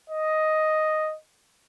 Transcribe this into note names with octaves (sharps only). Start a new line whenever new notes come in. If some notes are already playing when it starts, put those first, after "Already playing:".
D#5